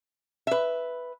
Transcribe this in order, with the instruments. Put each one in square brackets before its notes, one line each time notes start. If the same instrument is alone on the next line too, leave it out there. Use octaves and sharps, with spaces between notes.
[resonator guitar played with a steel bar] B4 E5